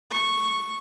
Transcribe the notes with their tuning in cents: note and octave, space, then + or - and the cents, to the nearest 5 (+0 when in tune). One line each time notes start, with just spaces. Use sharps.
C#6 -10